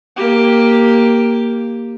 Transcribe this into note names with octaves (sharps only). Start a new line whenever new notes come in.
A#3 G4